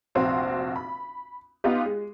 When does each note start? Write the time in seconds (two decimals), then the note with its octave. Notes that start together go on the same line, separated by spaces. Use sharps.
0.15 F1 A#1 C4 F#4 F5
0.76 B5
1.64 B3 D#4 F4 G4
1.85 G#3